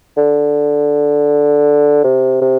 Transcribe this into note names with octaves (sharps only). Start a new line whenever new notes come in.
D3
C3
C3